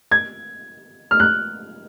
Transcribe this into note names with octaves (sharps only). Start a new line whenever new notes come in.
G#6
F6
F#6